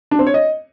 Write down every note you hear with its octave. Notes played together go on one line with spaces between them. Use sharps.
D4
C4
C#5
D#5